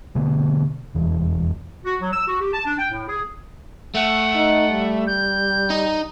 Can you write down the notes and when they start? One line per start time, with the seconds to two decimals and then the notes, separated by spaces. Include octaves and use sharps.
0.15 B2 D3 A#3
0.94 F1 E2 E3
1.85 F#4
2.01 F#3
2.13 E6
2.28 F#4
2.41 G4
2.53 A5
2.66 D4
2.79 G5
2.92 A2
3.08 G#4
3.95 A3 F#5
4.35 D#4
4.71 G3
5.07 G6
5.70 D#4